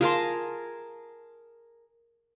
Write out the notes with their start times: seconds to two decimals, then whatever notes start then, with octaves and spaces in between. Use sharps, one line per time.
0.01 F4 G#4 A#4 A5 C6